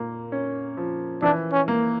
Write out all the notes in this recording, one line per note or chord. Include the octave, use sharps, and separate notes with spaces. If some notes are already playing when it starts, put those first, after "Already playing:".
Already playing: A#2 A#3
C#4
F3
E3 D4
C#4
A#3